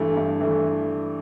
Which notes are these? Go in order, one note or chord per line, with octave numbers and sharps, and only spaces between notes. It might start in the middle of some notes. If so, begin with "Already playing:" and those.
Already playing: G2 E3 A3
G2
E3 A3